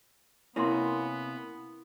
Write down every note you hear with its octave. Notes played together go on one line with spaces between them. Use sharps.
C3 A#3 B3 C#4 E4 C6